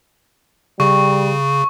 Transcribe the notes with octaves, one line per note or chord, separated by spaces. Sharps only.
C#3 G3 C#6